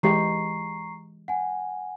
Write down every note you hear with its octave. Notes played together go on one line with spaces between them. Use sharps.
E3 G#3 G4 A#5 C#6 C7
F#5 G#5